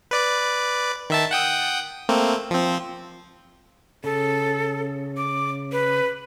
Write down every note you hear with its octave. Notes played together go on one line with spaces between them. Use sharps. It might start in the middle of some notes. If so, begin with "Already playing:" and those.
B4 D5 D6
D#3 E5 A5
F#5 G5 D#6
A3 A#3 C4
F3 C4
C#3 A4
D6
B4